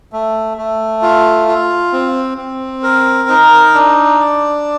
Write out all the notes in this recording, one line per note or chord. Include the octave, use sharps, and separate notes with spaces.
A3
A3
F4
F4
C4
C4
A#4
D#4
D4
D5